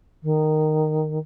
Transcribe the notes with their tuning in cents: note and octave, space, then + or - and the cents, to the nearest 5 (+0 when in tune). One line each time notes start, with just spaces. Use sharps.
D#3 -10